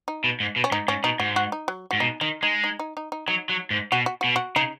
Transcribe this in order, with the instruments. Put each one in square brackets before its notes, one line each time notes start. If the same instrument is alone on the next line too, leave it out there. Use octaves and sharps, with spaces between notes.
[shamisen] D#4
[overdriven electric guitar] B2
G#2
B2
[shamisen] C#4
[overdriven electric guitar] G#2 [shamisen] D#4
[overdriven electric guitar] G#2 [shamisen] C#4
[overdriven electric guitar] B2 [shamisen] D#4
[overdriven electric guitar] G#2 [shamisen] F#4
[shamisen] F#4
D#4
F#3
[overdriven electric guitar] G#2 [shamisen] F#4
[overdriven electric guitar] B2 [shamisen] D#4
[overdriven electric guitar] D#3 [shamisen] D#4
[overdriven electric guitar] G#3 [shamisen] D#4
[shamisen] D#4
D#4
D#4
D#4
[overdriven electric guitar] F#3 [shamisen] D#4
[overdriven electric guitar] F#3
G#2
[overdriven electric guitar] B2 [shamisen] F#4
[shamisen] F#4
F#4
[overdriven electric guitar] B2
[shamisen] F#4
[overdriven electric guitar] C#3 [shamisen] D#4